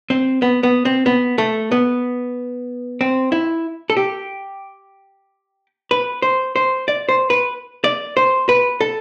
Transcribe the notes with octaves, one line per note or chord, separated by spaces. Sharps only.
C4
B3
B3
C4
B3
A3
B3
C4
E4
A4
G4
B4
C5
C5
D5
C5
B4
D5
C5
B4
A4